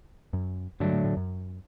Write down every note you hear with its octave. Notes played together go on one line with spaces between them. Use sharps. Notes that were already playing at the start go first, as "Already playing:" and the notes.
F#2
G2 D3 F#3 A3 D4
A2
A2
F#2